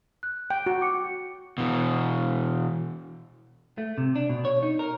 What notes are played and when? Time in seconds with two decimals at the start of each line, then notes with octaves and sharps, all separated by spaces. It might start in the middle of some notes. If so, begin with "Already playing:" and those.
0.23 F#6
0.50 G5
0.66 F#4
0.81 D6 C#7
1.58 B2 E3
3.78 A3
3.98 C3
4.16 D4
4.29 B2
4.45 C#5
4.63 D#4
4.79 A#4